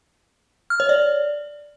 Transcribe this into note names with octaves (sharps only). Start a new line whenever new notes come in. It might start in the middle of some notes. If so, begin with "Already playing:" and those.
F6
C#5
D5